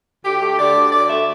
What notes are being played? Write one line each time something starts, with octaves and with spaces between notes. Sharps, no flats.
D2 G4
A3
D3 D5
D2
D2 D5
A3 E5